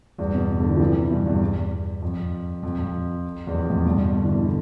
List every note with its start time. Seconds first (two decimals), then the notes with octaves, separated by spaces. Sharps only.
0.18 E2 G2
0.34 G2 B2
0.60 B2 D3
0.70 C3 E3
0.76 F3
0.80 C3 E3
0.90 C3 E3
1.11 G2 B2
1.26 E2 G2
2.02 F2
2.63 F2
2.78 F2
3.47 E2
3.54 F2
3.70 F2 A2
3.85 G2 B2
4.16 D3
4.25 E3
4.34 B2 D3